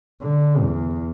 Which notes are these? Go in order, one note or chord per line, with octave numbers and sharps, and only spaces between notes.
D3
E2